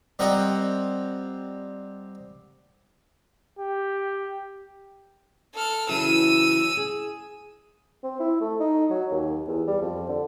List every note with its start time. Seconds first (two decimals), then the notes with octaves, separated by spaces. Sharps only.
0.19 G3 C4 F4 A#4 D#5 F#5
3.59 G4
5.54 A4 F6
5.89 C#3 E3 F#3 E6 D#7
6.77 G#4
8.03 C4
8.20 E4
8.41 A3
8.60 D#4
8.90 F#3
9.11 D#2
9.48 E2
9.68 G3
9.82 F2
10.09 D3